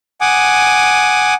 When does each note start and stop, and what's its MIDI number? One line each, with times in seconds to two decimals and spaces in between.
0.21 1.34 78
0.21 1.34 80
0.21 1.34 86
0.21 1.34 87